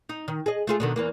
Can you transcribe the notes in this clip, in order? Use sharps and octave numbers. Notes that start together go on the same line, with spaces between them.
D#4
D#3
G#4 D#5
A3 F4 G#4
B2 D3 D#3
E2 E3 A#3